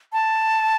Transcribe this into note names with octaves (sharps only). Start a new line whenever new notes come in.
A5